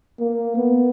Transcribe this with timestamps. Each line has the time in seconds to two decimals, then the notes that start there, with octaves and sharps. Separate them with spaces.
0.20 A#3
0.56 B3